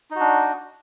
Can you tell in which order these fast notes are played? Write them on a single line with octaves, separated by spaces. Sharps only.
D#4 F#4 D4